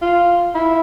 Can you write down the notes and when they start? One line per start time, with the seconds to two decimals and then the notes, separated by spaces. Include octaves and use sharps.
0.01 F4
0.54 E4